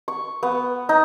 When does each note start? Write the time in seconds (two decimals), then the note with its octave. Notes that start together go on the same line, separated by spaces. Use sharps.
0.08 C#6
0.43 B3
0.89 D#4